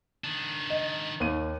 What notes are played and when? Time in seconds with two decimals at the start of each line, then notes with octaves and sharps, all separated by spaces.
0.24 D#3 D4
0.70 D#5
1.20 D#2 D#7